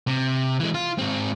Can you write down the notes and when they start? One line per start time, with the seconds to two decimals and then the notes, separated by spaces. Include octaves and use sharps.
0.07 C3
0.60 E3 G#3
0.75 F4
0.99 G#2 C4